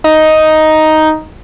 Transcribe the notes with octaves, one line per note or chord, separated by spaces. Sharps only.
D#4